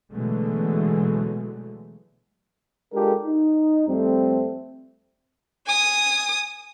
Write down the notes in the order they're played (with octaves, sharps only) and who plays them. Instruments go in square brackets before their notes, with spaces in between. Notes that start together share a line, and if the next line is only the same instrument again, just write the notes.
[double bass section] B2 D3 E3 F#3 G#3 A3
[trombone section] G#3 D4 F4 G4 A4 A#4
D#4
F2 G3 A3 C4
[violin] G#5 D#6